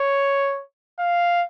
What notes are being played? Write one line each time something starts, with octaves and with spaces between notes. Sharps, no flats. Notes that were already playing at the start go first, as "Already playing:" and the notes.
Already playing: C#5
F5